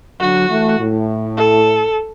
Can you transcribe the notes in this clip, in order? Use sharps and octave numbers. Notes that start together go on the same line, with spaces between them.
D3 F#3 F#4
E3 A3
A2
A4